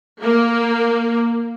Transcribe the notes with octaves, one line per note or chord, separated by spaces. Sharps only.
A#3